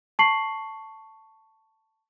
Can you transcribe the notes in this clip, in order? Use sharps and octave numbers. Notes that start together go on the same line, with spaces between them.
A5 C#6 C7 F#7